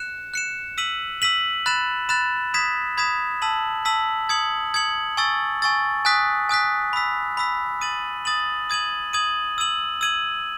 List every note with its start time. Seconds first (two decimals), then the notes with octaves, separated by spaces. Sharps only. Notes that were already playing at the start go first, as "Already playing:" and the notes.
Already playing: F#6 C#7 E7
0.34 F#6 C#7 E7
0.78 E6 B6 D#7 F#7
1.22 E6 B6 D#7 F#7
1.66 B5 F#6 A6 E7
2.09 B5 F#6 A6 E7
2.54 B5 D#6 G#6 B6 E7
2.97 B5 D#6 G#6 B6 E7
3.42 A5 E6 B6 F#7
3.85 A5 E6 B6 F#7
4.29 D#6 G#6 C#7 F#7
4.74 D#6 G#6 C#7 F#7
5.17 G#5 C#6 E6 A6
5.62 G#5 C#6 E6 A6
6.05 G#5 D#6 F#6 B6
6.49 G#5 D#6 F#6 B6
6.93 B5 E6 B6
7.37 B5 E6 B6
7.81 D#6 A6 D#7 F#7
8.25 D#6 A6 D#7 F#7
8.70 D#6 G#6 D#7 F#7
9.13 D#6 G#6 D#7 F#7
9.58 E6 G#6 D#7 F#7
10.01 E6 G#6 D#7 F#7